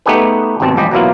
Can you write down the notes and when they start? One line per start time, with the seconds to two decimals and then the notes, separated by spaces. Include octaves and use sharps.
0.06 A3 B3 D#4 G4 G#4 B4
0.60 G#1 D#2 B2 C4 A5
0.76 A1 F3 G3 G4 D#5
0.91 B2 F#3 A#3 E4 F4